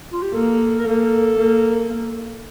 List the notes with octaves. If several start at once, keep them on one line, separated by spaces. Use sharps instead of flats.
F4
G4
A#3 A4
A#4
A#3 A4
A#3